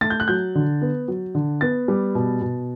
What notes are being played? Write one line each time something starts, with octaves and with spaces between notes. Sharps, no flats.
A3 A6
G6
F#6
F#3 G6
D3
B3
F#3
D3
B3 A6
G3
B2
B2